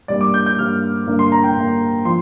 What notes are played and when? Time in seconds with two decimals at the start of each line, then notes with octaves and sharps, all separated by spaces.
0.08 G2 G3 A#3 D5
0.21 D6
0.34 G6
0.46 G6
0.59 G2 G3 A#3 F6
1.07 G2 D3 A#3
1.19 C6
1.32 A#5
1.44 G5
1.56 G2 D3 A#3
2.05 F3 C6